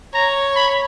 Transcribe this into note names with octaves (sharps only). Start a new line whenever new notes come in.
C#5 A#5
B5